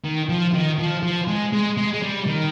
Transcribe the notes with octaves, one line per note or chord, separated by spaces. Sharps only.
D#3
F3
D#3
F3
F3
G#3
G#3
G#3
G#3
G3
D#3